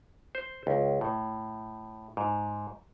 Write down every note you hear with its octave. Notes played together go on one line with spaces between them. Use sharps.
C5
C#2
A2
G#2